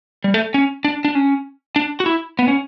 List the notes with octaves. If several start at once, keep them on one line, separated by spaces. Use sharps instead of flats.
G3
A3
C#4
D4
D4
C#4
D4
F#4
E4
B3
C#4